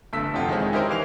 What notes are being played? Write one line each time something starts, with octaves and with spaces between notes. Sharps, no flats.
G1 G2 A3 E6 B6
F2 C3 F4 F#5
D#3 G#3 E4 G#4 C5 C#5
C#4 D#4 E4 G4 A#4 C5
E3 F5 F7